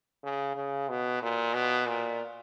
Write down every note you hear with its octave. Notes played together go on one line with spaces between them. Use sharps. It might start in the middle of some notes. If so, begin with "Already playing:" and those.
C#3
C#3
B2
A#2
B2
A#2